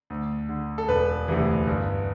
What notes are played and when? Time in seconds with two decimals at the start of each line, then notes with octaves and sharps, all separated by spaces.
0.10 D2
0.49 D3
0.78 A4
0.88 E1 B4
1.28 D2 C3 E3
1.67 G1